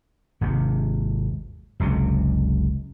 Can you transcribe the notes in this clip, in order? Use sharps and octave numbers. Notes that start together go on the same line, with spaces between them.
G#1 D#2 C3
F#1 C#2 C3